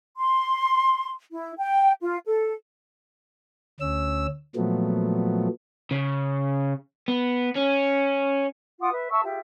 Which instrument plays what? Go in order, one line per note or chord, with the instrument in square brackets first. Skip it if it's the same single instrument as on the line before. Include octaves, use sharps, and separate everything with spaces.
[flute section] C6
E4
G5
F4
A4
[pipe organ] D2 C#4 E6
A#2 F3 F#3 A3 B3
[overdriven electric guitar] C#3
B3
C#4
[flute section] F4 F#5 D6 D#6
B4 E5
E5 A5 C#6 E6
F4 G4 G#4 E5